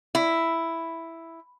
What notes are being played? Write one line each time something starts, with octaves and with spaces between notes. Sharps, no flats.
E4